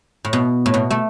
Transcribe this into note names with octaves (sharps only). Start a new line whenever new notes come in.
A2
B2
A2
B2
A3